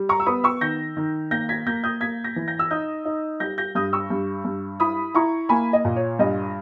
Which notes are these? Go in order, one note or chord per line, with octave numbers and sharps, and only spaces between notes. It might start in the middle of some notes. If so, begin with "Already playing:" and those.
Already playing: G3
A#5 C#6
E6
B3 B5 D#6
C#6 E6
D#3 G6 A#6
D#3
A#3 G6 A#6
G#6 B6
A#3 G6 A#6
D#6 G6
A#3 G#6 B6
G6 A#6
E3
G6 A#6
E6
D#4 D#6 G6
D#4
G3 G6 A#6
G6 A#6
G2 D#6 G6
C#6 E6
G2
G2
E4 B5 D#6
E4 A#5 C#6
A#3 G#5 B5
D#5
A#2
C#5
G2 D#5